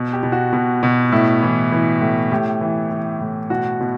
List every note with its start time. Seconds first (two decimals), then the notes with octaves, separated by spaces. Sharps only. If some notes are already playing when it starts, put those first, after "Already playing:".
Already playing: B2
0.13 G4
0.23 B2
0.32 F#4
0.53 B2
0.83 B2
1.12 A2 E4
1.42 E3
1.72 E3
2.01 A2
2.32 A2 G4
2.61 E3
2.91 E3
3.21 A2
3.50 B2 F#4
3.81 B2